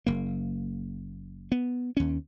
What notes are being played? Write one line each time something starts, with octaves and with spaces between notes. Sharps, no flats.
F#1 A#3
B3
D#2 C#4